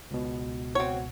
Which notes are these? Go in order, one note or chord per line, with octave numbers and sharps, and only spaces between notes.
C#2 B2
C4 F#4 C#5